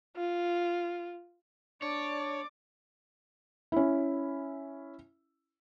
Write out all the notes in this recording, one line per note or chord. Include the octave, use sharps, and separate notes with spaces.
F4
D4 C#5 D5 D6
C#4 E4